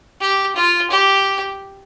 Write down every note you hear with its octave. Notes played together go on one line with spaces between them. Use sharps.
G4
F4
G4